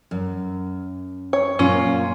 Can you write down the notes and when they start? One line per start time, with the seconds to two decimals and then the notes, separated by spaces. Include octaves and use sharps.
0.11 F#2
1.33 C#5
1.59 F#2 A#2 C#4 F4